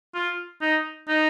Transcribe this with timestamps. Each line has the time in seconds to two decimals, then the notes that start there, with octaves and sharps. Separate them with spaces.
0.14 F4
0.61 D#4
1.09 D#4